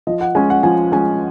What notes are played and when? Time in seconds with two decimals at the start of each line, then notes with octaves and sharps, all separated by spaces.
0.07 F3 D#5
0.21 F#5
0.35 G#3 C#4 G#5
0.50 F#5
0.63 F3 G#5
0.92 G#3 C#4 G#5